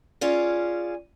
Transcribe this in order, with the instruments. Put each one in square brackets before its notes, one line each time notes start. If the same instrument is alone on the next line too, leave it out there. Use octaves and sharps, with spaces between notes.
[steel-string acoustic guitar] C#4 F4 G#4 D5